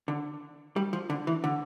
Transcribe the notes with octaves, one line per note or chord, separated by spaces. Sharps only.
D3
G3
F3
D3
E3
D3